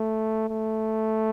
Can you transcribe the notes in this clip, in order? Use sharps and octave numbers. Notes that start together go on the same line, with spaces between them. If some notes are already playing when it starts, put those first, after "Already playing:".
Already playing: A3
A3